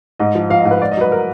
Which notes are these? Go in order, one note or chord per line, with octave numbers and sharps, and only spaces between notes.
G#2 D#5
F3
F3 F5
G#2 D#5
B4
G#2 D5
D#5
F#3 B4
A#4